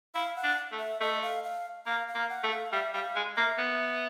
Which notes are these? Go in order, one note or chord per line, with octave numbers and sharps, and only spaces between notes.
E4 F5
F#5
D4
A3
E5
A3 D#5
F5
F5
A#3 F5
F5
A#3
F#5
A3
F5
G3 E5
G3 F5
G#3
A#3 E5
B3